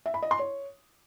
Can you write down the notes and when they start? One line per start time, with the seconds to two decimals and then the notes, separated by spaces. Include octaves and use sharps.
0.06 E5
0.14 B5
0.23 D#5
0.31 C6
0.39 C#5